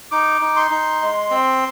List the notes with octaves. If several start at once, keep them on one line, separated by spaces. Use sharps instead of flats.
D#4 D6
D#4
C6
D#4
G#3
C4